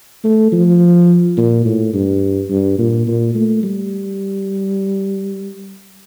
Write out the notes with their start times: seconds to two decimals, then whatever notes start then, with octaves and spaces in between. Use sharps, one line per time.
0.24 A3
0.52 F3
1.37 A#2
1.65 A2
1.93 G2
2.50 G2
2.78 A#2
3.07 A#2
3.35 A3
3.63 G3